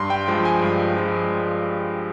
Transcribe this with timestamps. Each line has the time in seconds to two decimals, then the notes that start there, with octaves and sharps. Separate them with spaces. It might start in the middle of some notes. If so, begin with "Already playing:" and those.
Already playing: G2 C6
0.10 G5
0.28 F3 G#3
0.45 G#5
0.62 G2
0.96 F3 G#3